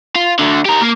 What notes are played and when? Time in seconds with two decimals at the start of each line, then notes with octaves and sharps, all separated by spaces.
0.16 F4
0.39 D2 D3
0.65 G4 A#4
0.81 A#3